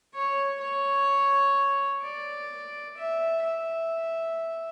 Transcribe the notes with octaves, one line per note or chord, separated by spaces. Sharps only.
C#5
C#5
D5
E5
E5